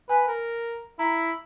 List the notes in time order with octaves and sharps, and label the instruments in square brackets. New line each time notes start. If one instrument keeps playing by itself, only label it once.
[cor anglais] B4 [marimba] G#5
[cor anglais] A#4
[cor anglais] E4 [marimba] A#5